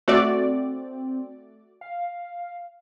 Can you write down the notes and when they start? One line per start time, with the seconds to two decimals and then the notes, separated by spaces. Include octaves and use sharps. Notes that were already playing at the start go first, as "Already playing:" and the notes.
0.08 A3 C4 F#4 D5
1.81 F5